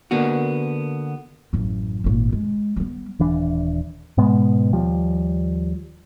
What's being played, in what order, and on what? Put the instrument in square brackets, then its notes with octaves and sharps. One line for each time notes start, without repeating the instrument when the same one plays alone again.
[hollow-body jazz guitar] D3 A#3 B3 F#4
[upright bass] A1 F#2
G#1 A#2
G#3
G3 B3
[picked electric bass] D#1 E3 D4
G#2 B2 G#3 B3
D#2 F3 G3